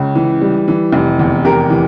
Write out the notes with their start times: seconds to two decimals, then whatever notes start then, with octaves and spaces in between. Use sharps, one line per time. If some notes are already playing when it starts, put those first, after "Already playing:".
Already playing: C#2 C#3
0.15 E3
0.42 G3
0.68 E3
0.93 F1
1.19 E2
1.44 F1 G4 A#4
1.70 E3